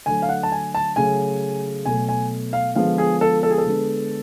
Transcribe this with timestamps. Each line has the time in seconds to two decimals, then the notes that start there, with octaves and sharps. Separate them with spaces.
0.06 D3 F#3 A3 G#5
0.22 F5
0.29 F#5
0.43 A5
0.52 G#5
0.75 A5
0.96 C#3 F#3 A3 G#5
1.86 B2 F#3 A3 G#5
2.09 G#5
2.53 F5
2.75 D3 F3 G#3 B3 F5
2.98 G#4
3.21 A4
3.43 A4
3.51 G#4
3.58 A4
3.65 D3 G#3 B3